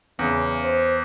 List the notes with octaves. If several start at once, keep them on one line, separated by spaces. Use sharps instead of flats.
E2 C#3
C5